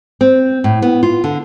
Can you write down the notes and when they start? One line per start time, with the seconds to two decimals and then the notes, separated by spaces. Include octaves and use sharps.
0.21 C4
0.64 A2
0.82 B3
1.03 F4
1.24 D3